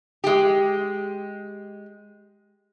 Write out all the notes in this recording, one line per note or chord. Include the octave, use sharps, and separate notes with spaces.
G#3 G4